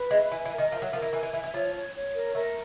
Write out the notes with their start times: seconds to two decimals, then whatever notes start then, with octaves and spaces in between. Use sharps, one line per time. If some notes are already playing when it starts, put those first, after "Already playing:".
Already playing: B4
0.11 G#3 E5
0.32 E3 G#5
0.45 E3
0.52 A#4
0.58 D#3
0.72 F3 E5
0.82 F#3
0.93 F3 A#4
1.02 E3
1.13 E3 G#5
1.23 E3
1.33 E3 E5
1.44 E3
1.54 F3 C#5
1.74 C#5
1.95 C#5
2.14 A#4
2.35 A3 A#4